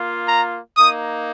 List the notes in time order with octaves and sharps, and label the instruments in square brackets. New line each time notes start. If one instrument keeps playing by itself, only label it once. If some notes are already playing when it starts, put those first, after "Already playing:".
Already playing: [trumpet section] A#3 F4
A#5
A#3 D#4 D#6